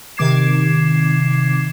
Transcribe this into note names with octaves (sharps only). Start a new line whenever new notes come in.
C3 D#3 D6 G#6 C7 E7